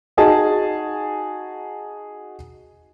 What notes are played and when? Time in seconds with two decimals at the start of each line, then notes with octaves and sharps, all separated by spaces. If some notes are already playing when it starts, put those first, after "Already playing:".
0.17 D#4 F#4 G#4 D#5 A5